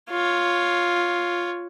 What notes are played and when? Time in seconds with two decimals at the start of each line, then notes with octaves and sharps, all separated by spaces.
0.10 F4 C#5